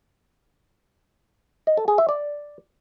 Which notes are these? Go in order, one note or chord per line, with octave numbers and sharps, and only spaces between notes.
D#5
A4
G#4
E5
D5